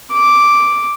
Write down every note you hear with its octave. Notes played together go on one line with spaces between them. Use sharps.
D6